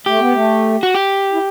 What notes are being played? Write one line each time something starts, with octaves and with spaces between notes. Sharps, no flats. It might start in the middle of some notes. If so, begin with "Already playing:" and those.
A3 G4
B3
A3
F#4
G4
E4